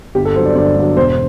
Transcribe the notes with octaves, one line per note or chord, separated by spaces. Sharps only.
G1 G4
A4
G2 F#3 C5
D5
G1 D5
G2 F#3
E1 C5